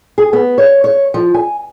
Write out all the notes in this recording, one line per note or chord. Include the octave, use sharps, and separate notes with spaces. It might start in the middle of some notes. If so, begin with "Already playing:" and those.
G#4
B3
C#5
C#5
F3
G#5